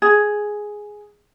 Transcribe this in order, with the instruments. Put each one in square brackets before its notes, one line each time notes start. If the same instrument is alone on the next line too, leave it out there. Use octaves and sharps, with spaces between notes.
[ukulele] G#4